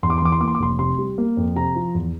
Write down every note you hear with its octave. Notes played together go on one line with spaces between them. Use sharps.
E2 C6
D6
C6
E3 D6
C6
A#3 D6
C6
D6
F1 C6
C3 C6
G3
A#3
F2
C3 A#5
F3
E2